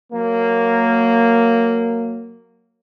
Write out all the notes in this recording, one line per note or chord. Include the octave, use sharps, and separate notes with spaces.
F#3 A#3